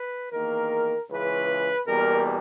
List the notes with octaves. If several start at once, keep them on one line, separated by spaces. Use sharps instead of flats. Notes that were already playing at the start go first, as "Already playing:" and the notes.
Already playing: B4
E2 D#3 A#3 A#4
C#2 C#3 E3 B4
E2 B2 G3 A#3 A#4